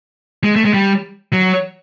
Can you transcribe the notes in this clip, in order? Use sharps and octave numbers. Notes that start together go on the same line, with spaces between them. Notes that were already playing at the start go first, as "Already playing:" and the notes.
G#3
A3
G#3
G3
F#3